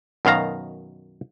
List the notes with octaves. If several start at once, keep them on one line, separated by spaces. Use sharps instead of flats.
F#2 B2 D#3 F5 A#5